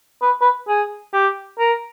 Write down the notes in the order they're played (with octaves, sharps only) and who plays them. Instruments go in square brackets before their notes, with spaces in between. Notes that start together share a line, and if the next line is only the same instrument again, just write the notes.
[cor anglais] B4
B4
G#4
G4
A#4